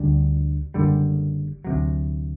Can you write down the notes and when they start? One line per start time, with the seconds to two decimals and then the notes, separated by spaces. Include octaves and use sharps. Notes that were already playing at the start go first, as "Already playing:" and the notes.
Already playing: D2 D3 G3
0.74 F#1 F#2 D3 G3
1.64 D2 C3 F#3